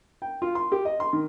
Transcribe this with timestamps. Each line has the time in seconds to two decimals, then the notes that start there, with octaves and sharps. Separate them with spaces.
0.22 G5
0.42 F4
0.55 C6
0.72 G4
0.85 D#5
1.00 C6
1.13 D#3